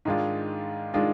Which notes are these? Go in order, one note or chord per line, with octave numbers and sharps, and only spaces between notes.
G#2 D#3 G#3 D4 F4
D#3 G#3 D4 F4